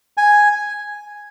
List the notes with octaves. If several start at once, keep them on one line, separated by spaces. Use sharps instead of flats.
G#5